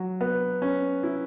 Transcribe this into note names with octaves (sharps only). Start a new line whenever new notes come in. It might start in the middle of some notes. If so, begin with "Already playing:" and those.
Already playing: F#3
B3
C#4
E4